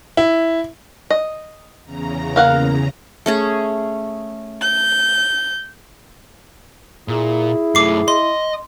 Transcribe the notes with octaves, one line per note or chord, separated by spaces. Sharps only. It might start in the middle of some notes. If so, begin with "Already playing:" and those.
E4
D#5
E2 C#3 A#5
A#3 F5 F#5
A3 C#4 G#4
G6
A#2 E4 G#4
F#2 A3 D6 C7
D#5 C6